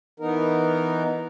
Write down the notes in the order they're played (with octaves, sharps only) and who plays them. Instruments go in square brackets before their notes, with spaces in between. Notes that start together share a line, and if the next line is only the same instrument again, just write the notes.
[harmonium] E3 B3 D#4 A#4